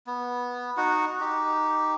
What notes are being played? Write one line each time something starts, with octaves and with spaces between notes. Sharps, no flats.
B3
D#4 F#4 F#5
D#4 G4